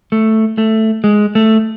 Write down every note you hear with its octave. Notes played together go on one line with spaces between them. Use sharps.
A3
A3
G#3
A3